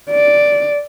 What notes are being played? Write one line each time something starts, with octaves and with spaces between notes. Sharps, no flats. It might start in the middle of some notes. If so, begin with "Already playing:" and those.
D5